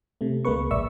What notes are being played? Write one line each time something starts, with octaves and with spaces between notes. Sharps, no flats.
C3 A3
C#2 G#3 A#3 A#4 B4 C#6
A1 D5 E5 C#6 E6